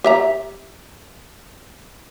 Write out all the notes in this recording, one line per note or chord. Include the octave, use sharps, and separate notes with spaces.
G4 E5 A#5